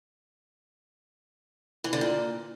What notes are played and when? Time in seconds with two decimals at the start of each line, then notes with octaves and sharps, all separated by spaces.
1.84 E3
1.93 D3
2.01 A#2